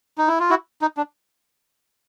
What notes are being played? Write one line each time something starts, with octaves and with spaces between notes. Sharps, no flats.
D#4
E4
F4
E4 F#4
D#4
D4